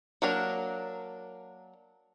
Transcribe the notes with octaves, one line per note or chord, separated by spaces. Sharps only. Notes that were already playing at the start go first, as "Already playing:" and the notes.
F#3 A#3 D4 A#4